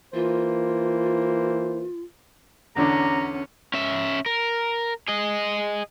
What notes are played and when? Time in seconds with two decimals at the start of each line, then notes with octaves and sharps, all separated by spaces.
0.14 E3 A#3 F4 C5
2.76 E2 D3 C#4 D4 A#5
3.74 C#4 E5
4.26 A#4
5.08 G#4 D#5